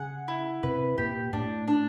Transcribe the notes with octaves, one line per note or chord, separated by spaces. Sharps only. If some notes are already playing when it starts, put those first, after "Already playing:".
Already playing: C#3 G#4 F#5
E4
C3 B4
A#2 G4
A2 D4
D4